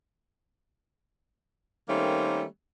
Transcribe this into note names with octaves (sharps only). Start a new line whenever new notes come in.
D#3 G3 A3 A#3 C4 C#4